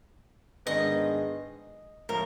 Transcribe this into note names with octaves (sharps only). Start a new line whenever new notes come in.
G#2 D#3 G#3 B3 D4 D#5
A2 F3 A#4